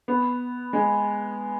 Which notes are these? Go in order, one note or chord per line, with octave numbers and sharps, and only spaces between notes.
B3
G#3